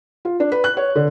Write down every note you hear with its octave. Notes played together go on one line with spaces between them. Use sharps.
F4
D4
B4
F#6
C#5
D3